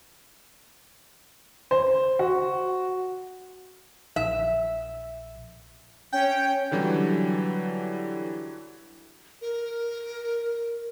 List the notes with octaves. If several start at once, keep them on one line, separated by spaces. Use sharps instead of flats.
C5
F#4
A#1 E5
C#4 G5
D3 E3 F#3 G3
A#4